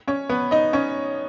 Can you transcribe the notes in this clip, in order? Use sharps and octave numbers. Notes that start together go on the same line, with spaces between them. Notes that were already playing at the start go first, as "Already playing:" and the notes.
C#4 C#5
B3 B4
D#4 D#5
C#4 C#5